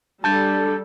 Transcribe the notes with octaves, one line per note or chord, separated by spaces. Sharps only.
G3 D4 A4 A5 G6 A6